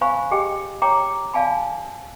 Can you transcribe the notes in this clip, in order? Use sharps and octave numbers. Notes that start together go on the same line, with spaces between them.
C5 F5 G#5 B5 C#6
G4 G#4 D#5 G5
C#5 G5 A#5 D6
D5 F5 G#5 A5 B5